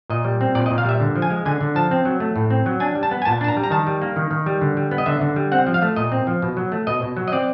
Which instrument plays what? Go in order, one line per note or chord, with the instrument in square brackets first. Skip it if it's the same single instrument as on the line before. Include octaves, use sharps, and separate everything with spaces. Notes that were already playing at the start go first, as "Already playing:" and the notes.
[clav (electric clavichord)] A#2 D#5
G3
C4
A#2 D5
D#5
A#2
F5
G3 E5
D3
F3
G#5
G#3
D3 G#5
D3
F3 A5
C4
F#3
A3
A2
C4
F#3
D4 G#5
G3
A5
B3
G#5
A#2 A5
D4 A5
A#5
G3
A#5
D#3 A5
G3
A#3
D#3
D#3
G3
D3
G3
B3
D#5
D3 E5
D3
G3
C4 F#5
F3
F5
A3
A#2 D#5
C4
F3
B2
F#3
A3
B2 D#5
B2
F#3
D#5
C4 D5